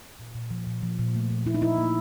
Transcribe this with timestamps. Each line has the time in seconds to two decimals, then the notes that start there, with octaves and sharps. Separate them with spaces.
0.19 A#2
0.35 A#2
0.51 F3
0.67 A#2
0.83 F3
0.99 A#2
1.15 A3
1.30 A#2
1.46 A#2 E4
1.54 D#4
1.62 F3 E4
1.78 A#3